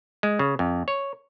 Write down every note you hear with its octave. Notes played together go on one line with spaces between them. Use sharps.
G#3
C#3
F2
C#5